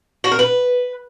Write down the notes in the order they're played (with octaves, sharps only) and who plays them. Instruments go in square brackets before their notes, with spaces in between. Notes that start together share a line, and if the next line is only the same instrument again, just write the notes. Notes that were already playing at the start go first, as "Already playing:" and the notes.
[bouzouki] F#4
A#4
B4